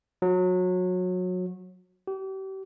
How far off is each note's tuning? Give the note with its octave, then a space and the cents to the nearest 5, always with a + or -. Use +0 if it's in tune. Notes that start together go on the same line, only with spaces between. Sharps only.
F#3 -25
G4 -35